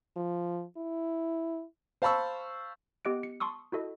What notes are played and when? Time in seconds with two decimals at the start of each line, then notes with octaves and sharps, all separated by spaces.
0.17 F3
0.77 E4
2.02 C5 F5 A5 B5 C#6 E6
3.05 B3 G4 D#5 F#6 D7
3.23 C#7
3.40 A5 C6 C#6 D#6 E6
3.72 E4 F#4 A4 D#5